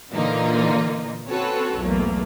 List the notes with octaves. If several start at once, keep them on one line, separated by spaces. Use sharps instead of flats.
A#2 D3 E3 A#3 D#4 F4
C4 C#4 F#4 A4 B4 C#5
B1 E2 A3 A#3